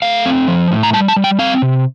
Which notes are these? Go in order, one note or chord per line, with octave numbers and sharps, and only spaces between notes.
A3 F5
C4
F3
A2
A#5
G3 A5
A5
G3
G5
C4 F5
C3